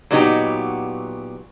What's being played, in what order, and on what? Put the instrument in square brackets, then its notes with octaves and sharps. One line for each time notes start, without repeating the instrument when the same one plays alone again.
[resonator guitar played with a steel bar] A#2 F#3 B3 D#4 F#4 G4